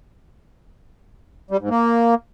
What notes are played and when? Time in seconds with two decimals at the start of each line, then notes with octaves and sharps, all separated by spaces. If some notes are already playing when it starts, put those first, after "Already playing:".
1.51 G3
1.60 G#2
1.70 A#3